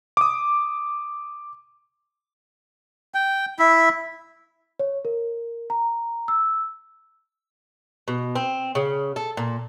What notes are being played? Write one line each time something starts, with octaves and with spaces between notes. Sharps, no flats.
D6 D#6
G5
E4 E5
C#5
A#4
A#5
E6
B2
C4
C#3
A4
A#2